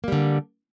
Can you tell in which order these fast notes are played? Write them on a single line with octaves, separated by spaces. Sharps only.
A#3 G3 D3